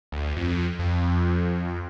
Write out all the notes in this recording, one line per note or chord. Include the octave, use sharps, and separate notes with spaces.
D2
F2
F2